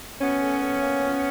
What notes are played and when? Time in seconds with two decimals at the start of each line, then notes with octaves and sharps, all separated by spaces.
0.21 B2 B3 C#4
0.41 A3
0.61 A3
0.82 A#3
1.02 F3